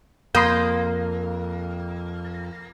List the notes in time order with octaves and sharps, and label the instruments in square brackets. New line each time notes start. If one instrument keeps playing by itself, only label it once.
[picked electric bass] F2 [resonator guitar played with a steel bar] A#3 [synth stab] C6 D#6 G6